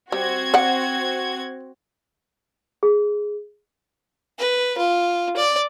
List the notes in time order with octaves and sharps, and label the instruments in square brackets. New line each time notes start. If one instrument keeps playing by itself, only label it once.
[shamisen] G3 [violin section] C4 F#4 G#6
[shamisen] D5 F#5
[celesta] G#4
[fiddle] B4
F4
D5